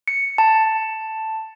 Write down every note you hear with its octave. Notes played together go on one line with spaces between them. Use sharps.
C#7
A5